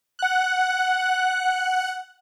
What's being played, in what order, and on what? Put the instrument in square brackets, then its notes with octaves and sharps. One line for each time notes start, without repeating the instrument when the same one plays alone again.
[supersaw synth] F#5 F#6